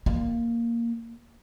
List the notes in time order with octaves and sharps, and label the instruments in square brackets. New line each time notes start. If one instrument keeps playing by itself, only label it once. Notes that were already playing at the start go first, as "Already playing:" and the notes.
[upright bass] A#3